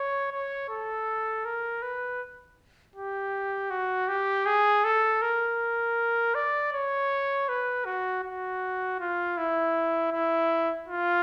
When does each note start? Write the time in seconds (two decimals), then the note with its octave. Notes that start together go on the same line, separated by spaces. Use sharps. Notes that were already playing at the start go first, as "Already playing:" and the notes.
Already playing: C#5
0.31 C#5
0.69 A4
1.45 A#4
1.82 B4
2.96 G4
3.70 F#4
4.08 G4
4.46 G#4
4.84 A4
5.22 A#4
6.35 D5
6.73 C#5
7.49 B4
7.85 F#4
8.24 F#4
9.00 F4
9.37 E4
10.12 E4
10.88 F4